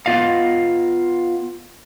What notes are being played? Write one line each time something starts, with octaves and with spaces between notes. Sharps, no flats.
B3 F4 D#5 F5